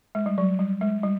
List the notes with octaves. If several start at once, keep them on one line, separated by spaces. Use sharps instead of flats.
G#3
G3
F#3
G3
G#3
G3